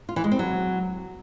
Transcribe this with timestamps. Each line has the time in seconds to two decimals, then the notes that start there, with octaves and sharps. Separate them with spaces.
0.09 F4
0.16 E3
0.24 G#3
0.31 C4
0.39 F#3